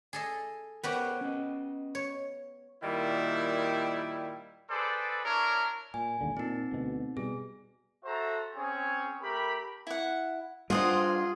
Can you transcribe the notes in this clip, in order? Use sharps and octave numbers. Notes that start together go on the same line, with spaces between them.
G#4 A4 D#5
B3 F#4 G4 A#4 C5 C#5
C#4 D#5
C#5
A#2 D#3 G3 E4
G#4 A4 B4 C5 D5
D4 E4 A#4 C#5
A#2 G#5
E1 D#2 D3
A#2 C4 D#4
D2 B2
B2 G3 G#4
F#4 A4 C5 E5 A#5
C4 C#4 G#4 C#5
A3 G4 A#4 B5
E4 F#5
G3 G#3 D4 F4 G#4 C5 D#5 F#5